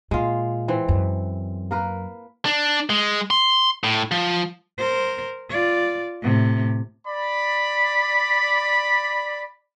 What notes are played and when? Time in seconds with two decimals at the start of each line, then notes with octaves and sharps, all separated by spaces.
0.11 A#2 G#3 F4
0.68 E3 C4
0.88 F#2
1.71 A#3 A#4 B4
2.45 D4
2.90 G#3
3.31 C6
3.84 A2
4.11 F3
4.78 A#4 C5
5.49 F4 D5
6.22 A2 C3
7.08 D5 B5